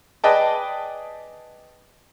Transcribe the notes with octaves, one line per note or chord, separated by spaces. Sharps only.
G#4 B4 D5 D#5 G5 A5